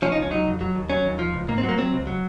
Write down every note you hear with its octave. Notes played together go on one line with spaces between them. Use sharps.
F3 C#4
D#4
C#2
C#4
F#3 D#4
F2
F#3
D#2
F#3 C#4
D#2
F3
C#2
G#2 A#3
C4
F#3
A#3
F#3 C4
C#2
F#3